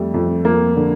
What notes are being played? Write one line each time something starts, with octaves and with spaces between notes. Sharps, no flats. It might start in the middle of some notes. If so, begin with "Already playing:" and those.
Already playing: F2 G3 A3
F2
F2 A#3
D3